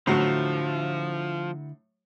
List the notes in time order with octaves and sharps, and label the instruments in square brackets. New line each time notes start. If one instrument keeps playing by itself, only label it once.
[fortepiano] A2 F#3 [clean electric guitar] D3 E4 [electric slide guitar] F3